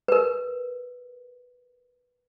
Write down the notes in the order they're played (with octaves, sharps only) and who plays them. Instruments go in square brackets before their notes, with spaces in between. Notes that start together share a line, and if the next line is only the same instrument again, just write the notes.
[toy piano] A#4 B4